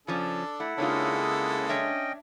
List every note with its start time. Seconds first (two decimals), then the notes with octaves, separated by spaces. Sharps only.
0.07 C#3 F3 C#4 D4 A4
0.60 A3 E4 F#5
0.78 C#3 G#3 A#3 D4 D#4 F4 A4
1.69 C#4 D4 C#5 D#5 E5 G5